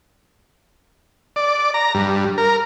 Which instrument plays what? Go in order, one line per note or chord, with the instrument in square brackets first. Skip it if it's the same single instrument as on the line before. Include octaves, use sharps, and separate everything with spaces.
[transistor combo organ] D5
A#5
G2
A#4